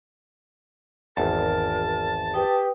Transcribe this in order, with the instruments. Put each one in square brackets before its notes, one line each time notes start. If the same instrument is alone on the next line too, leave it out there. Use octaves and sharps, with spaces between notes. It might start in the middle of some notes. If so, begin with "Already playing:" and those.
[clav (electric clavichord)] G#1 E2 [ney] A#4 [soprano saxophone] A5
[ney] G4 [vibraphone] B4 G5 D#6